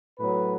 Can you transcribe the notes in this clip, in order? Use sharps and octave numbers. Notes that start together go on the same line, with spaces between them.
A2 F#3 B3 B4